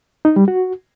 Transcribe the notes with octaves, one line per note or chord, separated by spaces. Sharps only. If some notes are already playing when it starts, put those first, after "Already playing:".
D#4
G3
F#4